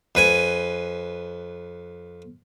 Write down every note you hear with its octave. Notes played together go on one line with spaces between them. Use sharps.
F2 B4 G#5